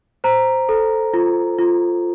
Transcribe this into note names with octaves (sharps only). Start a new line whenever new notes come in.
C5 A#5
A4
F4
F4